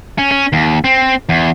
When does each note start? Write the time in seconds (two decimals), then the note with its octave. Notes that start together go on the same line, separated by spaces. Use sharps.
0.18 C#4
0.32 C#4
0.53 D#2
0.84 C4
1.29 E2